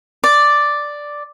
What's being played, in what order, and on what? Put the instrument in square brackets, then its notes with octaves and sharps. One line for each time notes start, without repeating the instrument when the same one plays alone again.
[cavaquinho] D5